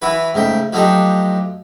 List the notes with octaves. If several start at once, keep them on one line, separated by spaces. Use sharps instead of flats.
E3 E4 F#4 B4
G#2 C#3 A3 G5
F3 F#3 A3 D4 D#4 G4